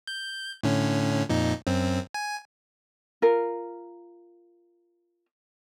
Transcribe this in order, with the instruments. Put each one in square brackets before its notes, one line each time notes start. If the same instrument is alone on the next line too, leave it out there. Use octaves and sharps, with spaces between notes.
[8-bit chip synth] G6
A2 D3 C#4
F2 A#2 D#4
F#2 C4
G#5
[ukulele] F4 A#4